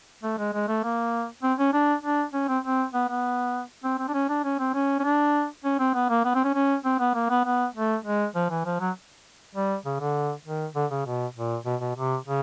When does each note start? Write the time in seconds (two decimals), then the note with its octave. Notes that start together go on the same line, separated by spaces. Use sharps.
0.23 A3
0.38 G#3
0.53 G#3
0.68 A3
0.84 A#3
1.43 C4
1.59 C#4
1.73 D4
2.03 D4
2.34 C#4
2.48 C4
2.64 C4
2.94 B3
3.09 B3
3.84 C4
3.99 C4
4.08 D4
4.14 C#4
4.29 D4
4.44 C#4
4.59 C4
4.74 C#4
4.99 C#4
5.04 D4
5.64 C#4
5.80 C4
5.94 B3
6.10 A#3
6.25 B3
6.35 C4
6.44 C#4
6.54 C#4
6.85 C4
7.00 B3
7.15 A#3
7.30 B3
7.45 B3
7.75 A3
8.05 G#3
8.35 F3
8.50 E3
8.65 F3
8.80 F#3
9.55 G3
9.85 C#3
10.00 D3
10.45 D#3
10.75 D3
10.91 C#3
11.06 B2
11.36 A#2
11.66 B2
11.81 B2
11.96 C3
12.26 C#3